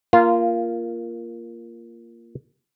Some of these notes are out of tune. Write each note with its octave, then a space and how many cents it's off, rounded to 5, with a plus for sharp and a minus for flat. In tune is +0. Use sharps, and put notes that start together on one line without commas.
A#3 +0 F4 -15 F5 +0